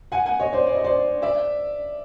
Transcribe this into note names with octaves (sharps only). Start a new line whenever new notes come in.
F#5 G#5
F#5 G#5
C#5 D#5
C5 D5
D5
D#5
C5 D5
D5 E5